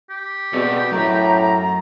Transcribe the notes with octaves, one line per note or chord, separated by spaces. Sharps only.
G4
B2 C4 G#4 A4 D5
A2 F#3 C#4 A#5